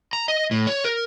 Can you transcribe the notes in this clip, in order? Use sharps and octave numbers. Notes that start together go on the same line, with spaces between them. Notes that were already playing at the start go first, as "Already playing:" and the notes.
A#5
D#5
A2
C#5
A#4